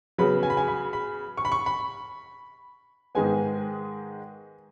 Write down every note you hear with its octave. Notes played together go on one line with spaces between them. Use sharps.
C#3 F#3 B3 B5
G#5
B5
G#5
B5
B5
C#6
B5
C#6
B5
G#2 D#3 G#3 B3 G#5